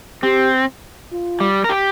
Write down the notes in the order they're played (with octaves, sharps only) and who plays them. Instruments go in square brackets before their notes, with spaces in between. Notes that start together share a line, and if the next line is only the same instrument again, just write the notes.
[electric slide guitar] C4 [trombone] G4
[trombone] F4
[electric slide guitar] G3
A#4
G4